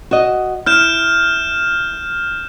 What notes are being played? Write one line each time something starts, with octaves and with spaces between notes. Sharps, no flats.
F#4 D#5
E4 F6 G6 E7